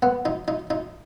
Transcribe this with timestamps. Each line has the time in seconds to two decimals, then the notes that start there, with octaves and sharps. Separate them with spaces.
0.02 B3
0.25 D#4
0.48 D#4
0.70 D#4